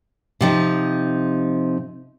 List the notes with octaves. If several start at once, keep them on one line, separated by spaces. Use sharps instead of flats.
C3 F3 D#4